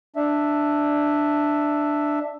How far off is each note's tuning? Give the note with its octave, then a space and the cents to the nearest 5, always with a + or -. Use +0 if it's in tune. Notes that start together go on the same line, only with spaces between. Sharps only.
D4 +5 E5 +0